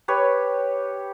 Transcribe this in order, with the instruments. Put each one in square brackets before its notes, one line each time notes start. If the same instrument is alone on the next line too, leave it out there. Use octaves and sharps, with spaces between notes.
[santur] G4 B4 C#5